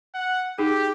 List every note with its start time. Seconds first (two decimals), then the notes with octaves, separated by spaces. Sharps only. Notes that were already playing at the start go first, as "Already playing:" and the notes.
0.15 F#5
0.58 D#4 G4 G#4